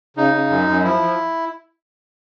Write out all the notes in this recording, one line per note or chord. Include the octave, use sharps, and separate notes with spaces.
C#3 D#4
C#3
F#2
F#2
F3 E4
F3